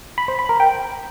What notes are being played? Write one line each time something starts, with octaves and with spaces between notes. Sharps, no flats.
B5
C5
B5
A#4
G5